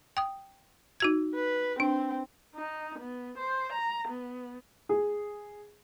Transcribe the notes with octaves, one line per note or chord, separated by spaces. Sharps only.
G5 D#6
D#4 F#4 G#6
B4
C4 D4
D#4
B3
C5
A#5
B3
G#4